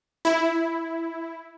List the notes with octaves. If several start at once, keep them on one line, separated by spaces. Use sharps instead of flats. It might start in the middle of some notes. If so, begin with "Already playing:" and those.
E4